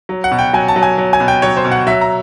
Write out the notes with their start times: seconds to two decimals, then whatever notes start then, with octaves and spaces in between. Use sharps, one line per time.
0.09 F#3
0.24 F#5
0.31 B2
0.39 G5
0.53 F#3 G#5
0.68 A5
0.76 F#3
0.83 G#5
0.98 F#3
1.13 G#5
1.20 B2
1.28 G5
1.42 F#3 C#5
1.57 C5
1.65 B2
1.71 F#5
1.87 F#3 E5
2.01 A#5